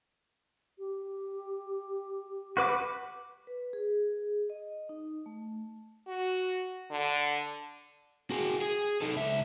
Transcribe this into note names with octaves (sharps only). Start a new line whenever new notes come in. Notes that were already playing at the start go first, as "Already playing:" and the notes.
G4
F#4 B4 D6
B4
G#4
D#5
D#4
A3
F#4
D3
F#4 G#4
G#4
D#4 A4
C#2 E5